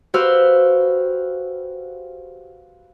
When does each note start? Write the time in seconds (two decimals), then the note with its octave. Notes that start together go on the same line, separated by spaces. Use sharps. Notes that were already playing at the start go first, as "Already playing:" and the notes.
0.14 F#4 G4 B4 C5 F5 E6